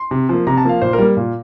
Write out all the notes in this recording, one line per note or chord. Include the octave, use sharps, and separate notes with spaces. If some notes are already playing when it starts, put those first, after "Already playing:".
Already playing: C6
C3
F3 A#3
C3 A#5
A5
F3 A#3 F5
A#2 C5
A#4
G3 A#3
A#2